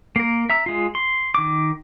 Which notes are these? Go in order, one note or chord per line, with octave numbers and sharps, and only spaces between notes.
A#3 A#4
E5 A#5 E6
G#3 F4
C6
D#3 D6